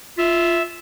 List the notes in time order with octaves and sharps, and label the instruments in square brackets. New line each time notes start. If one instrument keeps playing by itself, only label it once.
[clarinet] F4 [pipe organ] E5